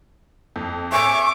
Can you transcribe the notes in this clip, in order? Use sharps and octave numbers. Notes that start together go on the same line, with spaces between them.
F2
E5 G#5 C#6 D6 E6